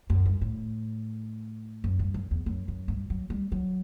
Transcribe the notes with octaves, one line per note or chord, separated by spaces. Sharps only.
F#2
G2
A2
F#2
G2
F#2
E2
F#2
F#2
G2
F#3
G3
F#3